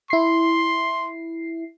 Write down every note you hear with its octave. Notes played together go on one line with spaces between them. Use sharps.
E4 C6 C7